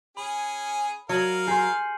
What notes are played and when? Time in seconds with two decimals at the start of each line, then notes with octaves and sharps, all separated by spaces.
0.17 C#4 G#4 B5
1.09 F#3 A#4 F5 C#7 D#7 F#7
1.47 G#4 C6 F6 G6 C7